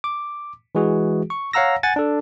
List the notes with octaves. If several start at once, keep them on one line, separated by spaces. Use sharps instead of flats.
D6
E3 G#3 F#4 G#4
C#6
C#5 F5 F#5 A#5 E6 A#6
F#5 G#5 A6
D4 A4